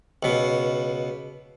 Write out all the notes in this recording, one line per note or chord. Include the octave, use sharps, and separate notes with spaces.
C#2 B2